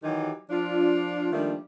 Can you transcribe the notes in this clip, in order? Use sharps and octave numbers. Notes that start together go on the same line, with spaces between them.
D#3 E3 F#3 D#4 G4
F3 D4 F4
D#3 F3 G3 A3 A#3 D4